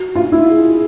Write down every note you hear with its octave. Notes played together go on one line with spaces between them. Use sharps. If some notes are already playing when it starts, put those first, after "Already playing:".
Already playing: F#4
F4
E4
G#4